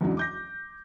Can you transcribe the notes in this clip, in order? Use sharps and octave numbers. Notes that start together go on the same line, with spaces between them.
E2 G#2 C#3 E3 F#3 D4
D6 G6 A#6